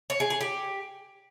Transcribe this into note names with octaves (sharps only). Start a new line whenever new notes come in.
C#5
G#4
G#4
G4